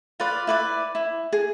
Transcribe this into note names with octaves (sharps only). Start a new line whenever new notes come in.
F4 B4 D5
E4 B4 D5
E4
G#4